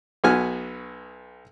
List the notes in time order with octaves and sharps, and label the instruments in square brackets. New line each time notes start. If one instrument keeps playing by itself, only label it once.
[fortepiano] B1 B3 F#4 G#5 F6